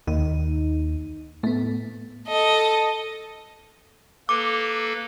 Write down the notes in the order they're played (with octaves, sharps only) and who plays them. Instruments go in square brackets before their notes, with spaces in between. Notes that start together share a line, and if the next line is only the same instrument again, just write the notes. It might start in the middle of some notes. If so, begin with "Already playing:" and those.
[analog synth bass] D#2 [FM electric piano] D#4
[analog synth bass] A2 [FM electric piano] A3 B3
[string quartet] A4 D#5
[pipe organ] A#3 A4 B4 [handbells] D6